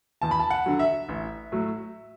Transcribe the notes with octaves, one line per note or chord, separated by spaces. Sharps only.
E2 A5
B5
A5
F#5
D3 F#3
E5
A1
A2 F#3